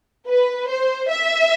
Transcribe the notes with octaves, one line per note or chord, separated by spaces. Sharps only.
B4
C5
E5